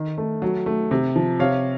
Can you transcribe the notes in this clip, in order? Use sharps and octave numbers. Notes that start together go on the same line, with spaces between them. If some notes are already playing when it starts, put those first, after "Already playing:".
Already playing: D#3
A3
F#3
A3
C3
F3
C3 C#5 F5